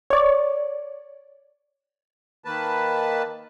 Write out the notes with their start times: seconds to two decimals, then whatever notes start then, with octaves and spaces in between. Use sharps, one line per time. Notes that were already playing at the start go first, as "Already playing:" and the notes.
0.10 C#5 D5
2.45 D#3 A#3 B4 A5